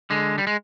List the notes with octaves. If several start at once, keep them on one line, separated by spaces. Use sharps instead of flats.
D3 G#3
G3
G#3